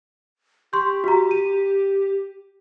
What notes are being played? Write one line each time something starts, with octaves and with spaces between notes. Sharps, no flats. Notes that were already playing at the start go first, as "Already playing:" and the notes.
G4 C6 C#6 G6
F#4 A#5
D#7